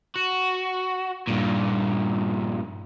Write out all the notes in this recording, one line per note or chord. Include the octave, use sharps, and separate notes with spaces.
F#4
G2 A#2